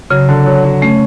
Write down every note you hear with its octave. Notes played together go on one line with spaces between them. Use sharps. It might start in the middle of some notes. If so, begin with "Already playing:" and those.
C#3 F#3
D3
F#3
F#3
A3 C#4